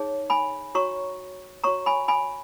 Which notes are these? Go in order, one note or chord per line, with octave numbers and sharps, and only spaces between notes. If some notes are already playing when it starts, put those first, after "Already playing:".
Already playing: D#4 G#4 C#5
G#5 B5
F#4 C#5 A#5 C#6
F#4 C#5 A#5 C#6
G#5 B5
G#5 B5